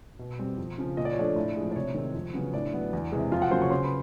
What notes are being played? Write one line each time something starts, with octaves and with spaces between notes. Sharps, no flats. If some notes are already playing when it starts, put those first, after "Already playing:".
B2
G3 C4
F2
C#3 F3
A#2 D#5
D5
C#5
F3 A3 D4 D5
A2
F3 G#3
D5
C3 C#5
D#3 G#3 C4
F2
C#3 F#3 B3
A2 D4 D5
F#3 B3
E2
C3 E3 G#3
F2 F4 F5
F#4 F#5
C#3 F#3 A#3 C5 C6
C#5 C#6
C#3 C5 C6
B4 B5